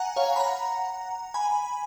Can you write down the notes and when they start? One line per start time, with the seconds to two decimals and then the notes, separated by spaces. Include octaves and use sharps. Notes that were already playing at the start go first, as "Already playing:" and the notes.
Already playing: F#5 G#5 A#5
0.16 C#5 F5
0.36 B5
0.40 F#5 A#5
1.34 G#5 B5